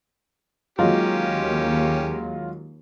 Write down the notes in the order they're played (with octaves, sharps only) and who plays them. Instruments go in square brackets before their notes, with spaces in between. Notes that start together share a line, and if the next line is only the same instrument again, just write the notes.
[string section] D#2 [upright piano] F#3 G#3 F4 [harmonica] C#4 G4